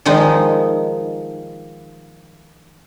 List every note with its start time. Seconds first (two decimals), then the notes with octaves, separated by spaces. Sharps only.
0.05 D#3 F3 G#3 D#4